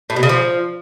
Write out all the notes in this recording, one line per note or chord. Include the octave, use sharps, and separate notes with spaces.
A2
B2
C#3
F3